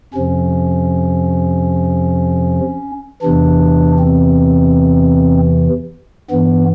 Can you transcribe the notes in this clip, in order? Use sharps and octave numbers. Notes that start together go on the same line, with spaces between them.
F2 C3 F3 C#4
E2 C3 E3 D4
C4
G2 E3 B3